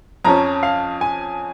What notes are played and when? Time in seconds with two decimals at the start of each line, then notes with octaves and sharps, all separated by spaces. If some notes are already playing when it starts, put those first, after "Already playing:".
0.25 F2 F3 C#4 A#5
0.63 F5
1.01 G#5